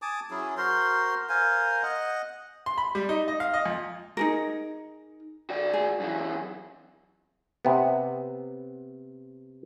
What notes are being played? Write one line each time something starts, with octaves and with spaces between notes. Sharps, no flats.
G#5 A5 D6 D#6
F#3 C#4 E4 G#4
F#4 A#4 C5 C6
A#4 C5 F5 G#5
D#5 F#5
C6
B5
G3
D#4
D#5
F5
D#5
F2
D#4 G#4 A#4
F#4 D5
G#4
F#2 E3
C3 B3